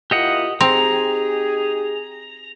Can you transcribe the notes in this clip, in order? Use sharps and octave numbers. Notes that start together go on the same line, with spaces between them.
A#3 E4 F4 G4 D#5 F#5
C4 D#4 G4 G#4 A#5